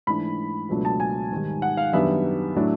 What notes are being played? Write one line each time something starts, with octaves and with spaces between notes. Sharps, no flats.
G#2 E3 A3 D4 B5
C#2 B2 F#3 A3 D4
A5
G#5
G#2 D#3 G3
F#5
F5
F#2 D#3 G3 B3 D4 E5
A2 F#3 A3 D4